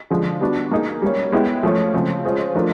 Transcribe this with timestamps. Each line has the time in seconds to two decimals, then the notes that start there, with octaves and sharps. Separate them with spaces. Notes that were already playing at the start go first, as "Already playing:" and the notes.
0.10 D3 F3 G#3
0.41 G3 B3 D4 F#4
0.71 A#3 D#4 G#4
1.02 G3 A#3 C#4
1.32 G#3 B3 E4 G4
1.63 F3 A3 C#4
1.94 C#3 F3 G#3 C4
2.25 G#3 C#4 F4 G#4 C5
2.54 F3 A3 D4 F4 A#4